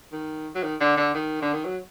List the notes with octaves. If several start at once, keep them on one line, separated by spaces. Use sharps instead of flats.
D#3
F#3
D#3
D3
D3
D#3
D3
D#3
F#3